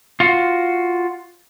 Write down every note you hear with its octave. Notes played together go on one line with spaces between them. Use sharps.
F4 F#4